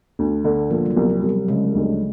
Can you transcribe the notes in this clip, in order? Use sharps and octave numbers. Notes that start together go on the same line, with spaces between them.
D2
D3
A#2 F3
G3
F#3
C2
G3
C2
G3
C#3 G#3
D2